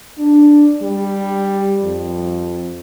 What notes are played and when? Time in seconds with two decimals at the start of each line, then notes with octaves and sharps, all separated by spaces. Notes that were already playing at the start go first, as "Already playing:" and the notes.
0.19 D4
0.82 G3
1.83 F2